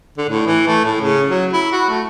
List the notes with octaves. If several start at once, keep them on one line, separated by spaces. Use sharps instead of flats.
D3
A2
E3
A3
A2
C#3
F#3
E4
F#4
A3